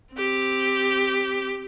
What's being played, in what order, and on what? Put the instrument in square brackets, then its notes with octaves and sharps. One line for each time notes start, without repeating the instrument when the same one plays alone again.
[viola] C4 G4